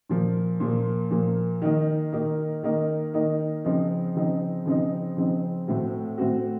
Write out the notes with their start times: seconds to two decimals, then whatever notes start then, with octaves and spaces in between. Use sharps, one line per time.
0.10 A#2 F3 A#3
0.60 A#2 F3 A#3
1.11 A#2 F3 A#3
1.62 D#3 A#3 D#4
2.13 D#3 A#3 D#4
2.63 D#3 A#3 D#4
3.14 D#3 A#3 D#4
3.65 C#3 F3 C4 D#4
4.15 C#3 F3 C4 D#4
4.65 C#3 F3 C4 D#4
5.17 C#3 F3 C4 D#4
5.67 A2 A3 C4 F#4
6.18 A2 A3 C4 F#4